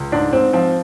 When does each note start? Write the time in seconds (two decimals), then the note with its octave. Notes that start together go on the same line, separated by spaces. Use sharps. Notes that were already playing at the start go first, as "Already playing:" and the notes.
Already playing: C#2
0.12 G#2 D4
0.33 G#2 C4
0.53 F3 C4